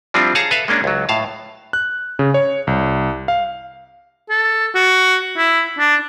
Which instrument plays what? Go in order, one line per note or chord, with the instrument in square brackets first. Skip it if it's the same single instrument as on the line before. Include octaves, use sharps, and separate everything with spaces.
[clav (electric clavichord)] F3 G3 C4 D4 E4 F4
G#4 C#5 F5 A5 A#5
A4 B4 E5 F5
G#3 A#3 C#4 D4
C#2 F#3
A2 F5 A5
[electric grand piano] F#6
C#3
C#5
C2
F5
[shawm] A4
F#4
E4
D4